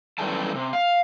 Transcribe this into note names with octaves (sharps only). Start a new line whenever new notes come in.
F#2 D#3 E3 G3 A3 A5
C3
F5